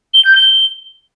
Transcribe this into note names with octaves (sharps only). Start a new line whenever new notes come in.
G7
G6
G7